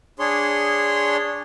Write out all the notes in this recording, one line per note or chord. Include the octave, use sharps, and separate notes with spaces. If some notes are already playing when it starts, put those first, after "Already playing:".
D4 G#4 C#5 C6